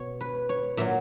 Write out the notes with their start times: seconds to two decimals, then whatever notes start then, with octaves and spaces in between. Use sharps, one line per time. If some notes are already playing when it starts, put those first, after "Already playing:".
Already playing: B2 C#5
0.21 B4
0.49 C#5
0.77 A#2 F#3 E5